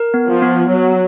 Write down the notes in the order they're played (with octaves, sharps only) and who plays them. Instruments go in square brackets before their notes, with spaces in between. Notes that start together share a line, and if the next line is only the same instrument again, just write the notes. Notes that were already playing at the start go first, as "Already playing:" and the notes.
Already playing: [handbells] A#4
B3
[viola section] F3
[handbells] B3
[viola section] F#3 [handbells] C#5